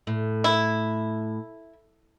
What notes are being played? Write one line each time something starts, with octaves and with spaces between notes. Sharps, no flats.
A2
E4